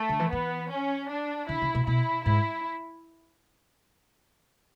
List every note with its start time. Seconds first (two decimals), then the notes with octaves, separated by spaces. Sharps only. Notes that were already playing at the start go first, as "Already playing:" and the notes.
Already playing: A3
0.09 D3
0.20 E3
0.32 E3 B3
0.71 C#4
1.09 D4
1.49 D3 E4
1.62 C#3
1.75 B2
1.87 B2 E4
2.26 G#2 E4